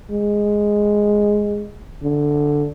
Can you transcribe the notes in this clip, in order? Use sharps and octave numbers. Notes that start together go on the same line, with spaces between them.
G#3
D3